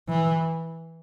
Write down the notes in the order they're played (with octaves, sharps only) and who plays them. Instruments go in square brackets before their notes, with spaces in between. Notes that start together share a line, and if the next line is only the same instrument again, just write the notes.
[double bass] E3